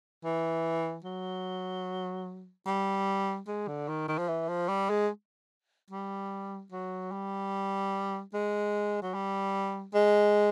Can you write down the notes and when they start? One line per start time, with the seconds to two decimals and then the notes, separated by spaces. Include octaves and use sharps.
0.25 E3
1.05 F#3
2.67 G3
3.48 G#3
3.68 D3
3.89 D#3
4.08 D#3
4.18 F3
4.28 E3
4.48 F3
4.69 G3
4.90 G#3
5.91 G3
6.72 F#3
7.12 G3
8.34 G#3
9.03 F#3
9.14 G3
9.95 G#3